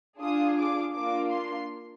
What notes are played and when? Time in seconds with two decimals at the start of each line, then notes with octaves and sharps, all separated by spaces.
0.19 D4 F4 G#4 D#6
0.57 D6
0.93 A#3 D4 F4 D6
1.31 C6